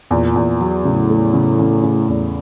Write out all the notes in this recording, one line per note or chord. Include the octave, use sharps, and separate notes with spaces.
E2 A#2
E2
F#3
A2 C#3
A3
C#3
C#3
C#3
E2